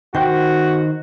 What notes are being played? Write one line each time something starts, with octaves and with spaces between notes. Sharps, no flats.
D#3 F#4 C5 G5 F#6